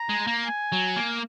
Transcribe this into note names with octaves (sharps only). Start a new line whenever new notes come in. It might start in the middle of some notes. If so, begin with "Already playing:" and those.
Already playing: A#5
G#3
A#3
G#5
F#3
A#3